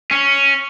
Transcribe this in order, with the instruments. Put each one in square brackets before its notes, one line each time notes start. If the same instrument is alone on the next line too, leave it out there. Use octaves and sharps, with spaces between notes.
[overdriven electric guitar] C#4